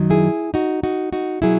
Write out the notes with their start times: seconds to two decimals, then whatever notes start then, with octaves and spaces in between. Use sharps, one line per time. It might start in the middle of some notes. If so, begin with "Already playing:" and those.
Already playing: F#2 D#3 F#3
0.10 E4 G#4
0.54 D#4 F#4
0.83 D#4 F#4
1.13 D#4 F#4
1.42 B2 F#3 E4 G#4